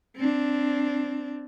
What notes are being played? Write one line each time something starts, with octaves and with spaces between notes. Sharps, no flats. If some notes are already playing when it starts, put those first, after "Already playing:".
C4 D4